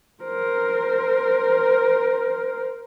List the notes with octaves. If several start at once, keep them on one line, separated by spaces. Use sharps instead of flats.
A#4 C5